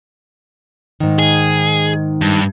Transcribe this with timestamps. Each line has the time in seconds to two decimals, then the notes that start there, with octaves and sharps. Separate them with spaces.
1.00 G#2 D#3
1.19 G#4
2.21 G2